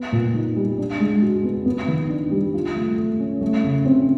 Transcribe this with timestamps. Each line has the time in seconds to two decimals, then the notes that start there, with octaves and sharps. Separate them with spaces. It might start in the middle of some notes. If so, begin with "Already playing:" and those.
Already playing: B3
0.12 A#2
0.35 D#4
0.56 G3
0.78 D4
1.00 G#3
1.22 F#4
1.44 B3
1.66 B3
1.88 D#3
2.10 D4
2.31 G3
2.54 F4
2.75 A3
2.98 A3
3.20 C#4
3.41 A3
3.64 C#3
3.85 C4